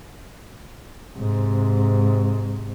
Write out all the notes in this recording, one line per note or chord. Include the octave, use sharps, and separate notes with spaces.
G#2 C3